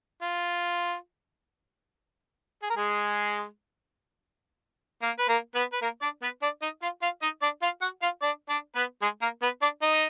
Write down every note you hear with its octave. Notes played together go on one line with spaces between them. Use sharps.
F4
G#4
A#4
G#3 G#4
A#3 A#4
B4
A#3 A#4
B3 B4
B4
A#3 A#4
D4 D5
B3 B4
D4 D5
D#4 D#5
F4 F5
F4 F5
D#4 D#5
D4 D5
F4 F5
F#4 F#5
F4 F5
D4 D5
D4 D5
B3 B4
G#3 G#4
A#3 A#4
B3 B4
D4 D5
D#4 D#5